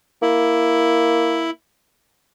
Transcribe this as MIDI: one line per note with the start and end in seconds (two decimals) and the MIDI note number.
0.22 1.50 58
0.22 1.50 64